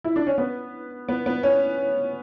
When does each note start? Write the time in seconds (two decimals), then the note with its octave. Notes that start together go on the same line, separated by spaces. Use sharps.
0.04 E4
0.16 D4
0.27 C#4
0.38 B3
1.08 B3
1.26 B3
1.43 C#4